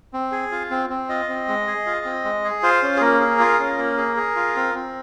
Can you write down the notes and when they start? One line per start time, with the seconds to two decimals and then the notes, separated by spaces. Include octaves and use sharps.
0.13 C4
0.32 G#4
0.51 F4
0.71 C4
0.90 C4
1.09 F4 D#5
1.29 C4
1.48 G#3
1.67 G#4
1.86 F4
2.05 C4
2.25 G#3
2.44 G#4
2.63 F4 C5
2.83 C#4
2.97 G#4
3.01 A#3 A#4
3.21 G#4
3.40 F4
3.60 C#4
3.78 A#3
3.97 G#4
4.17 G#4
4.36 F4
4.56 C4
4.75 C4